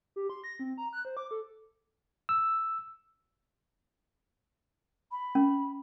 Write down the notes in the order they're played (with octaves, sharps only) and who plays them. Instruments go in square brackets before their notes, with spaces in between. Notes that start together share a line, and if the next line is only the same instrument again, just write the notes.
[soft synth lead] G4
C6
A#6
C4
A#5
F#6
C5
D6
A4
[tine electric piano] E6
[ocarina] B5
[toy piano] C#4